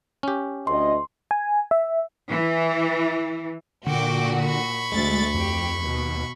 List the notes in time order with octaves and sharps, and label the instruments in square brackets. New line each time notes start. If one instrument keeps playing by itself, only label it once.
[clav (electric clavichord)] C#4 G4
[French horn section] D2 D#5 [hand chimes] C6
[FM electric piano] G#5
E5
[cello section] E3
[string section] A#2 F#4 [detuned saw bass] D3 [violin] G5 D6
[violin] B5 C#6
[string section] D2 A6 [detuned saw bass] G#3
[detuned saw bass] F2 [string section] G4
[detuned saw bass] D#2 [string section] B2